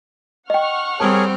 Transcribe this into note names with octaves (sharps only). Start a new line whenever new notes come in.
D#5 F#5 G5 C#6 F6
G3 C4 G#4 A#4 C#5 A5